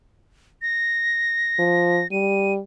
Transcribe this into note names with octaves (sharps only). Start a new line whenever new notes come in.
A#6
F3
G3 D#7